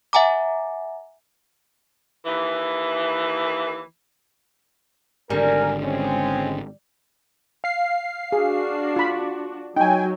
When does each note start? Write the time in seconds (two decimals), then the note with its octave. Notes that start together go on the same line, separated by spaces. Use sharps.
0.13 E5 F#5 G#5 A#5 D6
2.25 D#2 E3
5.30 G#1 D3 G3 A#4 G#5
5.82 G#3 C4 C#4
7.64 F5 C7
8.32 D4 F#4 G#4
8.96 F4 B5
9.76 F#3 D#4 G5 G#5